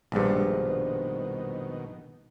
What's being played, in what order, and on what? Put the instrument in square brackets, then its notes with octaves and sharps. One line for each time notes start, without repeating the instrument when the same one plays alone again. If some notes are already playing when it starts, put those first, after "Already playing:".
[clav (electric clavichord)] A#1 G2 [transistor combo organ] B2 D#3 [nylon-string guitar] F3 G3 G#3